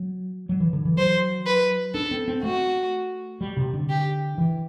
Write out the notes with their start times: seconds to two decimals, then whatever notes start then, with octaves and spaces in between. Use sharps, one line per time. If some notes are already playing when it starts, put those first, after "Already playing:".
Already playing: F#3
0.49 F#3
0.60 E3
0.73 D3
0.85 E3
0.97 F#3 C5
1.46 B4
1.94 D4 A4
2.11 C4
2.28 C4
2.43 A3 F#4
3.41 G3
3.57 C3
3.73 D3
3.89 G4
4.38 E3